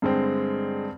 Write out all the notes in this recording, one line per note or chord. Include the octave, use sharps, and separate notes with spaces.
G2 D3 G#3 C4